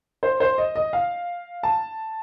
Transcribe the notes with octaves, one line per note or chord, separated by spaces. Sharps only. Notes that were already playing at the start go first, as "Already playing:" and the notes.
C5
C5
D#5
D#5
F5
A5